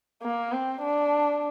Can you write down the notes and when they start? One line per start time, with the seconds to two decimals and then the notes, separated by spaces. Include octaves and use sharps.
0.23 A#3
0.53 C4
0.82 D4